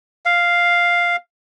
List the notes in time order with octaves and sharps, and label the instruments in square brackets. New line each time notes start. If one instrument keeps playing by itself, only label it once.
[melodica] F5